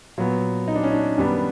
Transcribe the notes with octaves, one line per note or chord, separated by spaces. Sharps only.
A#2 F#3 B3
D#4
D4
C#4
D4
F#2 D#3 G3 B3